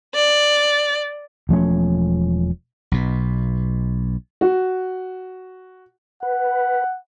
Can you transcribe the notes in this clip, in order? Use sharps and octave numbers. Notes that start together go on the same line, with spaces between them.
D5
E1 F3 A3 C#4
B1 B2
F#4
B4 F#5